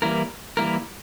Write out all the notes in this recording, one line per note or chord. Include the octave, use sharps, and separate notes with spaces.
E3 G3 A#3 E4 A#4
E3 G3 A#3 E4 A#4